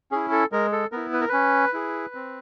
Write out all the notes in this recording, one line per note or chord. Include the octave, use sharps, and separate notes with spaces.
C#4 E4 G#4
A4
G#3 A#4
A4
B3 E4 A#4
B4
A#4
C#4 B4
E4 G#4
C4